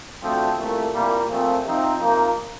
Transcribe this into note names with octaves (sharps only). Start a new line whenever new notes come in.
D2 D3 F3 A3 C4
C2 A#2 A3
C2 A#2 G3 A#3
A#2 F3 A3 C4
C3 F3 C4 D#4
C3 F3 A#3 D#4